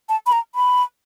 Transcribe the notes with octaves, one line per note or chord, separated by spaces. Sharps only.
A5
B5
A#5
B5